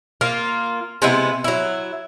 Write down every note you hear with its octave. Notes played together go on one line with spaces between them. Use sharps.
A#3 F4
C3 G#3 B3 E4
F#3 E4